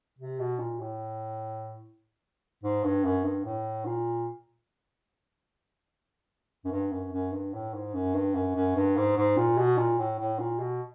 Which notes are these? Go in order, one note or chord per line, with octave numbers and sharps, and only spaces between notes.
C3
B2
A#2
A2
G#2
G2
F#2
G2
A2
A#2
F#2
G2
F#2
F#2
G2
A2
G#2
F#2
G2
F#2
F#2
G2
G#2
G#2
A#2
B2
A#2
A2
A2
A#2
B2